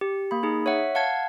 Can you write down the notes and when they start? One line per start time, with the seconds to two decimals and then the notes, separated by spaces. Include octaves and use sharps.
0.01 G4
0.31 A#3 B5
0.43 D#4 G#4
0.66 C#5 E5 F#5
0.95 F5 F#5 A5 G#6